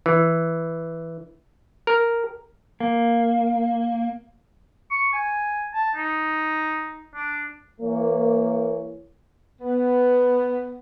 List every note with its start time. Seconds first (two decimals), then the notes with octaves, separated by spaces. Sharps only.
0.06 E3
1.87 A#4
2.80 A#3
4.91 C#6
5.13 G#5
5.74 A5
5.96 D#4
7.15 D4
7.81 E3 A#3 C#5
9.61 B3